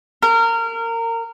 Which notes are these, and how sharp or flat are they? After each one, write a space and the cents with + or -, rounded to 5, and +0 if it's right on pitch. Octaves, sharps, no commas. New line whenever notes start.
A#4 -25